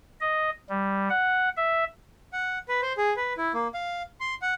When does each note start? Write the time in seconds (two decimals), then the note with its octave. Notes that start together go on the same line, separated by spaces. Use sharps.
0.21 D#5
0.69 G3
1.10 F#5
1.56 E5
2.33 F#5
2.68 B4
2.82 C5
2.97 G#4
3.16 B4
3.37 E4
3.54 A#3
3.74 F5
4.20 C6
4.42 F#5